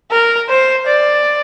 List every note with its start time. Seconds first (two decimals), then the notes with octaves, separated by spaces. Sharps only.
0.11 A#4
0.49 C5
0.86 D5